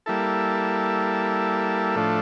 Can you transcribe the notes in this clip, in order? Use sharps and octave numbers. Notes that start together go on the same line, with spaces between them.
G3 A#3 E4 A4
A2 F3 A3 D4